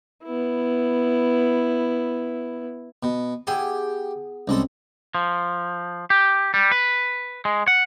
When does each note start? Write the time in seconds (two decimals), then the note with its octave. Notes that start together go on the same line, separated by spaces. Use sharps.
0.24 B3 E4
3.03 B2
3.47 B3 E4 G4 G#4
4.48 C2 G#3 C4 C#4 A4
5.15 F3
6.10 G4
6.54 G3
6.71 B4
7.45 G#3
7.68 F#5